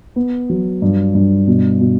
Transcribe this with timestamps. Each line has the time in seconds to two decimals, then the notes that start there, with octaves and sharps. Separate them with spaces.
0.16 B3
0.50 F#3
0.82 G2
1.15 G2
1.47 B2
1.81 B2